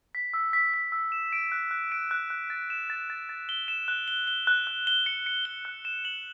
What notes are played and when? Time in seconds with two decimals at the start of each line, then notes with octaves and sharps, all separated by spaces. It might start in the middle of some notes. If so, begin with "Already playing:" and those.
0.15 B6
0.34 E6
0.53 B6
0.74 B6
0.92 E6
1.12 E7
1.33 D7
1.52 F#6
1.71 F#6
1.92 D7
2.11 F#6
2.30 F#6
2.50 A6
2.70 E7
2.90 A6
3.10 A6
3.29 A6
3.49 G7
3.68 E7
3.88 F#6
4.08 G7
4.27 G7
4.47 F#6
4.67 F#6
4.87 G7
5.06 C#7
5.26 C#7
5.45 G7
5.65 F#6
5.85 E7
6.05 F#7